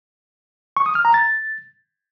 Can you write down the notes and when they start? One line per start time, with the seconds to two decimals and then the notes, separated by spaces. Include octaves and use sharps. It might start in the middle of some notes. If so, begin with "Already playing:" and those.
0.77 C#6
0.86 D#6
0.95 F6
1.05 A#5
1.14 A6